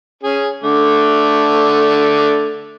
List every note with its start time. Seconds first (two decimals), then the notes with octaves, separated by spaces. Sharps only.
0.23 C#4 G#4
0.63 D3 A3 D6